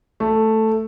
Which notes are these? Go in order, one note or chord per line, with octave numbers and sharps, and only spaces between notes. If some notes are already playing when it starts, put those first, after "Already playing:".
A3